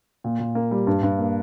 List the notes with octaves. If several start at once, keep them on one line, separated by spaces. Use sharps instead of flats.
A#2
A#2
A#3
G3
G2
G2
A#3